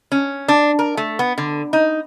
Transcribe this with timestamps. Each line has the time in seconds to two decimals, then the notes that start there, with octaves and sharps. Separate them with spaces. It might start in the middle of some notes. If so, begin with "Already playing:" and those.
0.12 C#4
0.48 D4
0.79 A#4
0.97 A3
1.19 B3
1.38 D3
1.73 D#4